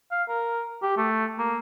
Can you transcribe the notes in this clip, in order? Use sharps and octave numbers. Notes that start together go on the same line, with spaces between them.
F5
A#4
G4
A3
A#3